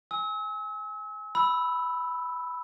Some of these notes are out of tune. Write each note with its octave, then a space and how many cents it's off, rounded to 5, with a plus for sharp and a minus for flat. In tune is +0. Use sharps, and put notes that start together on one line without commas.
G#5 +0 E6 -40
B5 +0 E6 +0